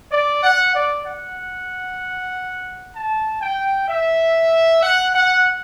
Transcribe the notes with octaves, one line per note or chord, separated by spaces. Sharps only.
D5
F#5
D5
F#5
A5
G5
E5
F#5
F#5